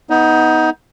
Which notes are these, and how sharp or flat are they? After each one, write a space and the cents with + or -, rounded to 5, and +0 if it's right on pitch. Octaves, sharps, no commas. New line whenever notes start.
B3 +0 D#4 +20